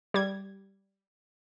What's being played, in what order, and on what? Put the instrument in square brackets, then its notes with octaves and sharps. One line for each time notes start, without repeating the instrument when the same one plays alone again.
[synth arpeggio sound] G3 G#6